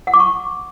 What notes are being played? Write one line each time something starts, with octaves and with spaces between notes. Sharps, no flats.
F#5
D6
C#6